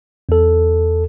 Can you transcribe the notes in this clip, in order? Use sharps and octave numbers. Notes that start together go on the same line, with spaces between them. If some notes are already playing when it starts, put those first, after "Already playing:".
E2 A4